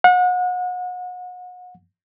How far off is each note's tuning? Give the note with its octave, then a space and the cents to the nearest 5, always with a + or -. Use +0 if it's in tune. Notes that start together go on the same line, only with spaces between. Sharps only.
F#5 -35